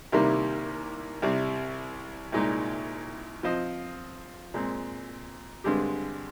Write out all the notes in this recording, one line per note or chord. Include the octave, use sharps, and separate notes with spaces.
C2 C3 D#3 G3 A#3
C2 C3 G3 C4
C2 A#2 G#3 D#4
F3 C4 F4 C5 D#5
A#2 G#3 C4
G2 D3 G#3 C4 G4